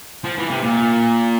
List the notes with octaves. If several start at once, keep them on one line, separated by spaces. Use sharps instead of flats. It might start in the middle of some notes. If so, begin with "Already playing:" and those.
F3
E3
C3
A#2